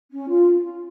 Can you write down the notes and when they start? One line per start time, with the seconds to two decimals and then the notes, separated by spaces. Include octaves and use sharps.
0.11 C#4
0.29 F4